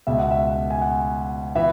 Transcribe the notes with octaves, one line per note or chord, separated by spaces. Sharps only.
C#2 B2 E5
F#5
E5
G#5
F#5
E3 E5